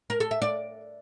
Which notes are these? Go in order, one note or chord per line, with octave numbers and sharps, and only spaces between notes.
A#4
A4
E5
D5